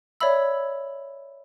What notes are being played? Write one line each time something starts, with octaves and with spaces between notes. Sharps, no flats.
C#5 D5 E5 B5 E6